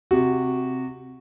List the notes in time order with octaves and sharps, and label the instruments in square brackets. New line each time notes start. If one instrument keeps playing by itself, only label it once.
[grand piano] C3 F#4